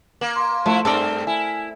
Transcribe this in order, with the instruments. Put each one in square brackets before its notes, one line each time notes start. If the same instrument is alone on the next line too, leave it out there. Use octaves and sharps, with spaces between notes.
[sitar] A#3 [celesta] F#7
[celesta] C6
[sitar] F3 E4 [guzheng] A3
[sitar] G2 C4 A#4 [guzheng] A4 D5
[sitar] E4 [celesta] G#5